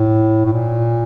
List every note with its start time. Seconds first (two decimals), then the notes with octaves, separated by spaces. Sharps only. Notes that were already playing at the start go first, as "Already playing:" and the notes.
Already playing: A2
0.45 A2
0.52 A#2